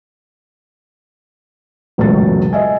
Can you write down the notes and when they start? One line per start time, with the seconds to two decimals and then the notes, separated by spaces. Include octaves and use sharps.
1.98 E1 C#2 F#2 B2 A3 A6
2.53 D#5 E5 G#5